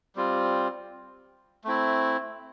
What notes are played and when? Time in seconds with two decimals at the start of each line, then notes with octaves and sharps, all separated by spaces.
0.16 G3 C4 F4
1.64 A3 C4 E4